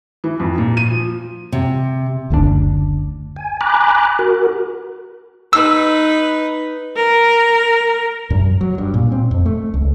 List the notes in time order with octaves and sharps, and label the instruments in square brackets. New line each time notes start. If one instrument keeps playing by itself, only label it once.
[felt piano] E3
F2
A#2
D#7
F3
[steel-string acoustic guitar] C3
[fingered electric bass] F#1 D2 A#2 D4
[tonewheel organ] G#5
G#5 A#5 B5 D6 F#6
F#4 A#4
[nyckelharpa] D#4 B4 [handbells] E6
[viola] A#4
[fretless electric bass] F#2
F#3
G2
A#2
C4
F2
A3
C#2